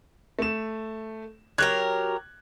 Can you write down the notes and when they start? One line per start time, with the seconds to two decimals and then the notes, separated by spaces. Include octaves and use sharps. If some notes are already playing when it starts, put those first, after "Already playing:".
0.39 A3 E7
1.58 F#3 G4 A#4 F#6 G#6